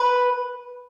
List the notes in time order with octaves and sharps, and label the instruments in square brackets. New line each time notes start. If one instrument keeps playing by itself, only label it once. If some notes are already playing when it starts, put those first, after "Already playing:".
Already playing: [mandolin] B4